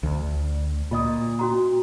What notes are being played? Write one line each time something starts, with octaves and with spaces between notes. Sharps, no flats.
D2
A#2 F4 D#5 D#6
C#4 F#4 A#5